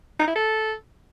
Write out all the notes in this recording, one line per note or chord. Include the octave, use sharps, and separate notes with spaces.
D#4
E4
A4